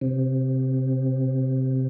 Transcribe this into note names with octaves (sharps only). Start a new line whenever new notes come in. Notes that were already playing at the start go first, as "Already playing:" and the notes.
C3